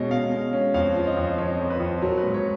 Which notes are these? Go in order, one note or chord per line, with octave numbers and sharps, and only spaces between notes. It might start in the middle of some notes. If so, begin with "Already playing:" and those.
Already playing: B2 G#3 C#4 D#5
B2 F5
G#3
C#4
F2 F5
F3
D#5
F2
F3 C#5
F2
B4
F2
F#3 A#4
B4
G#2
C#5